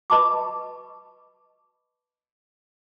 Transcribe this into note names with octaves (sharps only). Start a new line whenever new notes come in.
B4 D#5 A5 B5 C#6 D6